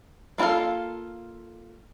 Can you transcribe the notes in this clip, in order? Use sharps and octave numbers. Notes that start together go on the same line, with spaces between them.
A#3 C4 F4 A4 F5